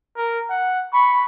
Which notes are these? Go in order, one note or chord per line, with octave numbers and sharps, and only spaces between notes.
A#4
F#5
B5 C#6